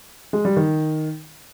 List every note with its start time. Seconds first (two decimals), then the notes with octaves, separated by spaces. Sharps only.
0.33 G#3
0.45 G3
0.56 D#3